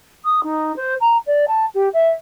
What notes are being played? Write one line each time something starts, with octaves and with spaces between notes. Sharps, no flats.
D#6
D#4
C5
A#5
D5
A5
G4
E5